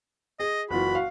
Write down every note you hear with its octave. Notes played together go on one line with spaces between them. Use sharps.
G#4 D#5
F#1 E3 F4 F#4 B5
F5